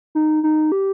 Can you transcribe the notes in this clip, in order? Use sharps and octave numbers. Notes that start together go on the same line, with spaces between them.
D#4
D#4
G4